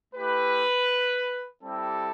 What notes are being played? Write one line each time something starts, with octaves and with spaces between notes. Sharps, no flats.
A3 E4 G4 B4
G3 C4 E4 G4 A4